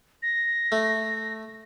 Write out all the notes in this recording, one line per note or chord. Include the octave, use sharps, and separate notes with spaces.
A#6
A3